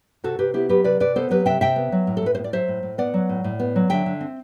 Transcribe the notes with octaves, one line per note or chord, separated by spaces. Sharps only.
C3 F#4 A4
C3 G4 B4
B3 E4 G4
F#3 G4 B4
C3 B4 D5
C3 B4 D5
B3 A4 C5
F#3 G4 B4
C3 E5 G5
C3 E5 G5
B3
F#3
A2
A4
A2 B4
C5
B3
D5
F#3 C5 E5
A2
A2
B3 D5 F#5
F#3
A2
A2
B3
F#3
D3 E5 G5
D3
C4